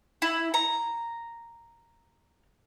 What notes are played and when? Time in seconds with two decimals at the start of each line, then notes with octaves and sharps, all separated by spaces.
0.22 E4
0.54 A#5